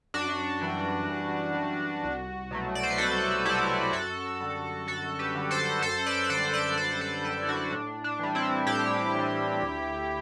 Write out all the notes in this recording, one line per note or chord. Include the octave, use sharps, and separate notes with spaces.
F#2 D4 F#4
E3 G3
F#2
E3 G3
C2
B2 F#3 A3
D5
C5
B4
C2 F#4 A4
B2 F#3 A3 E4 G4
F#2 F#4 A4
D3 G3
F#2 F#4 A4
G4 B4
D3 G3
A4 C5
F#2 A4 C5
B4 D5
D5
D3 G3 A4 C5
B4 D5
F#2 A4 C5
A4 C5
D3 G3 B4 D5
E4
D4 F#4
A2 D4
D4
E3 G3
C4 E4
A2 E4 G4
E3 G3
D2